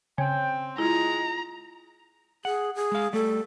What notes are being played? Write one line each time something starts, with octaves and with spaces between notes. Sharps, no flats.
C#3 C4 G5
G#3 E4 F4 A#5
G#4 F#5
G#4
G#3 F5
G3 A3 A4